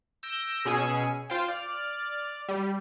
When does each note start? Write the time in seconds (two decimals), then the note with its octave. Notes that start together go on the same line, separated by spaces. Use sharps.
0.23 E6 G6 A#6 D7
0.65 B2 C#4 G#4 G#5 E6 C#7
1.30 F4 C5 F5 G5
1.48 D5 F6
2.48 G3